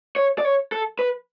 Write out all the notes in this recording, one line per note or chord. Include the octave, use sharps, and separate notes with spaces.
C#5
D5
C#5
A4
B4